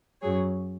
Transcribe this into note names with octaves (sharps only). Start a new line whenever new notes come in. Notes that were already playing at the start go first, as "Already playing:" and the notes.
F#2 F#3 G#4 C#5